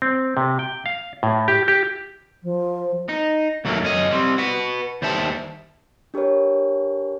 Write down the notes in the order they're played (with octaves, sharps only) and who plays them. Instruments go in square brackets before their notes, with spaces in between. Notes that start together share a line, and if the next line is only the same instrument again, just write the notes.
[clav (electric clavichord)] C4
C3
G5
F5
A2
G4
G4
[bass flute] F3
[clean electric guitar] D#4
D#2 F#3 A3 A#3
F#2 C#4 D#5
G3 C4
F#4 B4
D#2 G3 C5 E5 A5
[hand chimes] D4 G4 A#4 B4 C#5